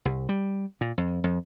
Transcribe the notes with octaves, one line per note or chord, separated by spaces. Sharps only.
C2
G3
A#2
F2
F2